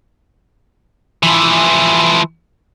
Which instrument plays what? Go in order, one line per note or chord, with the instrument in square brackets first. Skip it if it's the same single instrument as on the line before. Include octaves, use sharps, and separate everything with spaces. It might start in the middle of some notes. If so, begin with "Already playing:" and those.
[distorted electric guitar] E3 F3